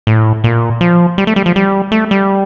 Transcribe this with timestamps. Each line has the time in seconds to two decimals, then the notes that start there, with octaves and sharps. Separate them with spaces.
0.07 A2
0.44 A#2
0.81 F3
1.18 G3
1.27 A3
1.36 G3
1.46 F3
1.56 G3
1.92 A3
2.11 G3